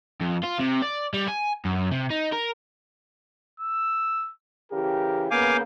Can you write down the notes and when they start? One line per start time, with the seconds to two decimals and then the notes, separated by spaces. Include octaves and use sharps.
0.21 F2
0.43 F4
0.59 C3
0.82 D5
1.14 G3
1.28 G#5
1.65 F#2
1.91 C3
2.10 D#4
2.32 A#4
3.60 E6
4.72 C#3 E3 G4 A#4
5.31 C#3 A#3 B3 F5 G#5 D6 G6